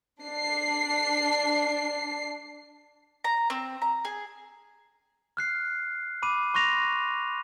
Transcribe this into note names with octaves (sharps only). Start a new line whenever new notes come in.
D4 C7
A#5
C4
A#5
G#4
F6 F#6 C7
B5 D6 D#7
C6 C#6 F#6 A#6 F7